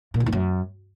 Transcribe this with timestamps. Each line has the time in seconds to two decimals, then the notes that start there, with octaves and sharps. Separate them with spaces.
0.14 A#2
0.20 D3
0.26 E2
0.32 F#2